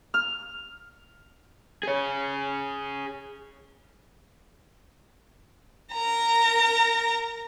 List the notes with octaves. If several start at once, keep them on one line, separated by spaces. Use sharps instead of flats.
F6
G#4 C#5
A#4 A#5